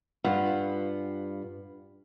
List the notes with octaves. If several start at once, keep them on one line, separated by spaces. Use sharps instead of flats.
G2 F4 B4 F#5